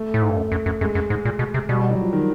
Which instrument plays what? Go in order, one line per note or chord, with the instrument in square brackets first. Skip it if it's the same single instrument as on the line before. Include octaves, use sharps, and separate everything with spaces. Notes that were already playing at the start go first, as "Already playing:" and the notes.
Already playing: [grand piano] A3
[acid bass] A2
G#2
G2
F#2
F#2
F#2
[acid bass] F#2 [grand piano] G#3
[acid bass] F#2
G#2
A#2
B2
C3
[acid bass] B2 [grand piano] G3
[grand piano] G3
F#3
F3
D#3